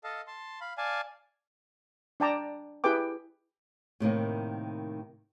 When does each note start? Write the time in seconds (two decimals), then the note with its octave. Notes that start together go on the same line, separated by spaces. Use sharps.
0.04 A4 D#5 F5 A5
0.27 A5 C6
0.61 F5 B5
0.78 D5 F5 G#5 A5
2.20 D4 D5 G5 A5 A#5 D6
2.84 E4 G4 G#4 B4 G5 D6
4.00 A2 C3 D#3 A#3